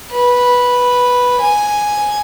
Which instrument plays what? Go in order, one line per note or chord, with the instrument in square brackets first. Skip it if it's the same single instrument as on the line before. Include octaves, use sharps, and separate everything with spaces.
[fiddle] B4
G#5